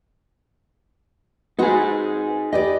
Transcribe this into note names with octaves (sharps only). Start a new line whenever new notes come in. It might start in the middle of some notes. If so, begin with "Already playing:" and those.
C4 D#4 F#4 G#4 B4
G4 B4 D5 D#5